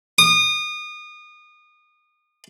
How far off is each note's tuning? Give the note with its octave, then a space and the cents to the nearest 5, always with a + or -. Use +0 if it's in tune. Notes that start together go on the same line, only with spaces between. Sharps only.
D#6 -30